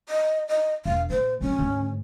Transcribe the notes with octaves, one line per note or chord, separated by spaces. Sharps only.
D#5
D#5
E1 F5
A#2 C5
A#2 F#3 C#4
D2 G#2